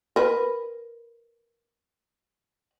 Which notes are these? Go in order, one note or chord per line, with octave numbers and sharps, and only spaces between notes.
A#4 B4